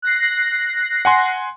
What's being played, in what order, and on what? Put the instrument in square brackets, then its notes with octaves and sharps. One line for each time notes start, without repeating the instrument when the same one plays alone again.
[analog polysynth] F#6 A#6 C7
[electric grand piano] F#5 G#5 C6